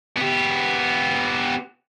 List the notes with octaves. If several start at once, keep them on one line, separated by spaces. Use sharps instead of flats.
B3 G4